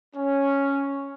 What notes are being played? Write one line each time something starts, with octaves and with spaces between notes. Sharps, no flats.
C#4